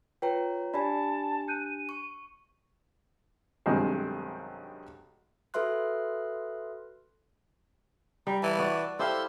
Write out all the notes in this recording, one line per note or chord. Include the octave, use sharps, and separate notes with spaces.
F4 B4 C#5 G5 A#5
D4 G4 D5 G#5 A5 B5
F#6 G6 C#7 D#7
C#6
B1 G2 C3 D#3 G#3 C5
F#4 A4 B4 E5 C6 F#6
G3 A#5
E3 A5
F#4 D5
E4 G4 A4 C5 F5 C6 E6